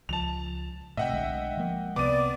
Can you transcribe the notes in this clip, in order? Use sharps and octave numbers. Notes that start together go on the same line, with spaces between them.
C#2 F3 A5 F7
A2 C3 D#5 E5 F#5 G5
B1 D3 G#3
F3 G#3 A#3
C2 C3 B3 D5 D6 D#7